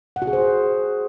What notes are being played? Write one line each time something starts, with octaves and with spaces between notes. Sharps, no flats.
F#5
F#4
G#4
C5